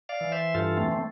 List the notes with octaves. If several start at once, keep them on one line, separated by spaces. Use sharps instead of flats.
D5 F5
E3
C5 E5
G2 F4 A4
A3 C4
C4